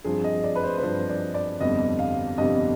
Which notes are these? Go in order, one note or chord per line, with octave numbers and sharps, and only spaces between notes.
G2 F3 C4 G#4
D#5
D5
B4
C5
B4
G2 F3 C4 C5
D5
D5
G1 F2 C3 G3 B3 D#5
F5
G1 F2 C3 G3 B3 D#5